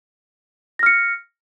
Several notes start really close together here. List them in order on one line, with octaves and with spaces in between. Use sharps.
A#6 F6 C#7